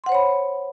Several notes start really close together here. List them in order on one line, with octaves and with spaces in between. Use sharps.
C6 F#5 C5 C#5 B5